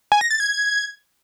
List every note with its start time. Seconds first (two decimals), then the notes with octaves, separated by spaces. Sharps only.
0.12 G#5
0.21 A#6
0.31 A6
0.40 G#6